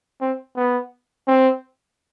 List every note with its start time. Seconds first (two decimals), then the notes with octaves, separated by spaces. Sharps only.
0.21 C4
0.56 B3
1.28 C4